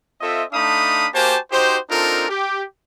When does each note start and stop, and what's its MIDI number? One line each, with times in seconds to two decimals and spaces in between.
0.21 0.44 60
0.21 0.44 65
0.21 0.44 69
0.21 0.44 75
0.21 0.44 76
0.53 1.07 57
0.53 1.07 62
0.53 1.07 63
0.53 1.07 77
0.53 1.07 83
0.53 1.07 87
1.14 1.37 58
1.14 1.37 66
1.14 1.37 67
1.14 1.37 72
1.14 1.37 80
1.14 1.37 81
1.52 1.77 63
1.52 1.77 66
1.52 1.77 67
1.52 1.77 72
1.90 2.26 60
1.90 2.26 62
1.90 2.26 63
1.90 2.26 65
1.90 2.26 69
1.90 2.26 70
2.29 2.62 67